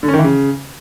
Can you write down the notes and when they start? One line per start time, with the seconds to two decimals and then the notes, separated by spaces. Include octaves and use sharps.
0.03 D3
0.08 C#4
0.14 D#3
0.19 E3
0.24 C#3